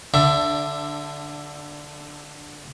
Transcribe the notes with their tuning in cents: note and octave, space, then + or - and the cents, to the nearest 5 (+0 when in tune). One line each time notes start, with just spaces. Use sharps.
D3 +0 D4 +15 E5 +20